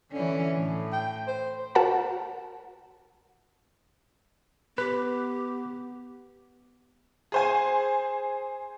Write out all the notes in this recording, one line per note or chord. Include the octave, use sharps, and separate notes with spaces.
D3 E3 C#4
A2
G5
C5
F#4 A#4 F#5 A5 A#5
B3 G4 B4
G#4 C5 G#5